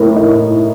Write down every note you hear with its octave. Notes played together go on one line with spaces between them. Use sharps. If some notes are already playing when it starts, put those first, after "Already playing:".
Already playing: A2 A3 A#4
D#4